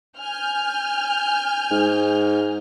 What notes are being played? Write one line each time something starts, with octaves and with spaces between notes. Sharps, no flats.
G#5 F6 G6
G#2